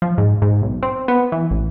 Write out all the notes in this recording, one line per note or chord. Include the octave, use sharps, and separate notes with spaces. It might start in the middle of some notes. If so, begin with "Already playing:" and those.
F3
G#2
G#2
B1
C4
B3
E3
A1